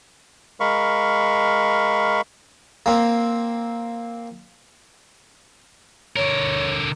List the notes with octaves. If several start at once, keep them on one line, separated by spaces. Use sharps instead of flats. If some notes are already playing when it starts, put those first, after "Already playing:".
G#3 A#4 F5 B5 C#6
A#3 C4
D3 A#4 C#5